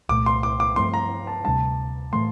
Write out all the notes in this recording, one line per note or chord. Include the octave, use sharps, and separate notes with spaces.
C2 A#2 A3 D6
C6
D6
D6
G2 F3 A3 C4 C6
A#5
A5
D2 C3 G3 D4 A5
A2 E3 A3 C6